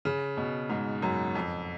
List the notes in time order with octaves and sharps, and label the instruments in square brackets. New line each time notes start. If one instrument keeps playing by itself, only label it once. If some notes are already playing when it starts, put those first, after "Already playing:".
[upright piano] C#3
B2
G#2
F#2
F2